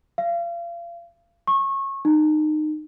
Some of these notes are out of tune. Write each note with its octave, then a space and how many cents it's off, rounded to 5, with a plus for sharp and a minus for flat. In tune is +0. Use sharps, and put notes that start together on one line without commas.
F5 -35
C#6 -25
D#4 -25